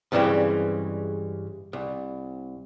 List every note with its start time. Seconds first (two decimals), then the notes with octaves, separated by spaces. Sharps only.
0.12 G2 C#3 E3 G3 G#3 C4
1.73 C2